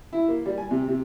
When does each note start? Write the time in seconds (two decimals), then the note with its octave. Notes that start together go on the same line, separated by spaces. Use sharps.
0.13 E4
0.28 A#3
0.46 G3
0.58 G#5
0.71 C3
0.88 C3